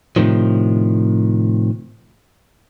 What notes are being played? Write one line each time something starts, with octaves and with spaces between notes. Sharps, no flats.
A2 C3 D#3 F3